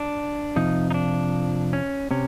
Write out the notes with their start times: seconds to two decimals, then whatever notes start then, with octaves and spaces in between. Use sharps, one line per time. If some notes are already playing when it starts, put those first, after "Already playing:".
Already playing: D4
0.56 F2 C3 F3 D#4
0.91 D#4
0.94 D4
1.73 C#4
2.11 C3 C#4